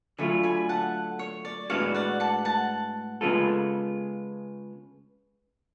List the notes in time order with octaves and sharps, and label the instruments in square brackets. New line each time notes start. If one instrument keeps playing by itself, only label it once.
[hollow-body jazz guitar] D3 F#3 A3 F4 [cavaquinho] G#5 B5
[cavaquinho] G#5 B5
F#5 A5
C#5
D5
[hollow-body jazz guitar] A2 G#3 B3 D4 F#4 [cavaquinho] C#5 F5
[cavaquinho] D5 F#5
F#5 A5
F#5 A5
[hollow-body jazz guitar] C#3 G#3 B3 F4 A4